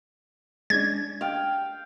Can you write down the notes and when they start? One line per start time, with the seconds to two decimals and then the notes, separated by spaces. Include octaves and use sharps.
0.70 G#3 C#4 D4 G#6
1.21 F5 G5